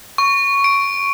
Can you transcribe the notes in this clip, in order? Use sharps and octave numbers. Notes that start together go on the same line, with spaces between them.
C#6
D7